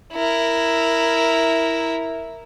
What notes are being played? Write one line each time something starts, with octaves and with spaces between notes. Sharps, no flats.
E4 A#4